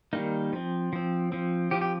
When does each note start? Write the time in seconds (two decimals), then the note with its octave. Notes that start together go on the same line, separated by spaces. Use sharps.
0.13 D#3 G3 A#3 D#4
0.53 F3 C4
0.93 F3 C4
1.32 F3 C4
1.71 F3 C4 G4
1.81 G4